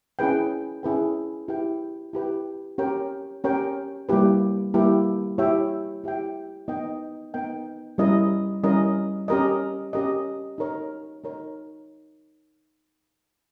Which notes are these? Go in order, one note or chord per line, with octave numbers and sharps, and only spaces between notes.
C#4 E4 G#4 B4 G5
C#4 E4 G#4 B4 G5
E4 G4 B4 G5
E4 G4 B4 G5
C#4 G4 A#4 C#5 G5
C#4 G4 A#4 C#5 G5
G3 A#3 E4 G4 B4
G3 A#3 E4 G4 B4
E4 G4 C#5 E5 G5
E4 G4 C#5 E5 G5
B3 D#4 A#4 D#5 G5
B3 D#4 A#4 D#5 G5
G3 C#4 E4 A#4 D#5
G3 C#4 E4 A#4 D#5
C#4 G4 A#4 D#5
C#4 G4 A#4 D#5
D#4 A#4 C#5
D#4 A#4 C#5